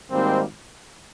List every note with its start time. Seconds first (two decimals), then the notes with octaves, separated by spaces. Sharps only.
0.11 G#1 G#2 D#3 G3 A#3 C4